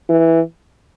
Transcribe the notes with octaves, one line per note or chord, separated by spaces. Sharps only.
E3